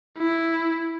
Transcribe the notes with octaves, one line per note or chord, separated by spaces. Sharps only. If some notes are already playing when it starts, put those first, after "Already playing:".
E4